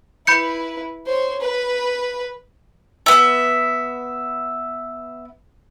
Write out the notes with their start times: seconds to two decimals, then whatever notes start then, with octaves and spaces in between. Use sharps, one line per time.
0.27 E4 B4 B5 G6 C#7
1.06 C5 C#5
1.41 B4
3.06 B3 E5